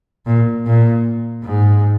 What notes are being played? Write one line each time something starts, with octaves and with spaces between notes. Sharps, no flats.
A#2
A#2
G#2